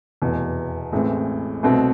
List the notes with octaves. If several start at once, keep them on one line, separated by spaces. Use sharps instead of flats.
F1 E2 B2
A1 A2 E3 G#3 C4
C2 B2 A3 C4